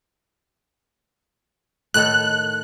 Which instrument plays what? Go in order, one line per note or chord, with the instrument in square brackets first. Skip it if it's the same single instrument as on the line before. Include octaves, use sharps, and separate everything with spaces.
[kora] A2 D#3 A4 [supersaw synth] F#6